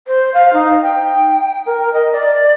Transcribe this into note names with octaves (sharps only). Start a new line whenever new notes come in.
C5
F5
D#4
G5
A#4
D#5
D5